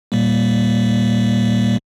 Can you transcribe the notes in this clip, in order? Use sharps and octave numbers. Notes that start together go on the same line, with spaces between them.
A#2 G3 A#3